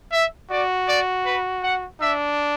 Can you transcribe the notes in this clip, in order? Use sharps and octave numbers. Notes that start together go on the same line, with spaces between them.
E5
F#4 D5
D5
B4
F#5
D4 E5